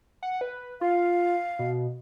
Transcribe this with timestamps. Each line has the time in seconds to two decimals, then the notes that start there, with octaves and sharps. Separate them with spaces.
0.23 F#5
0.41 B4
0.81 F4 F5
1.59 B2